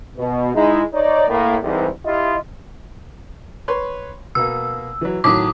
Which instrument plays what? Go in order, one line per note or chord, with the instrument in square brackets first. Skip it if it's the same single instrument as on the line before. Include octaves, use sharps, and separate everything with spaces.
[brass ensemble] B2
G#3 D#4 E4
D#4 C#5 D5
A2 A#3
C2 G#2 E3
E4 F4 G4 D#5
[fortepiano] B4 C#5 C6
[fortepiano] B2 A#3 [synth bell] E6
[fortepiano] E3 F#3
[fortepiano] A2 D#3 F#3 [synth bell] D6 D#6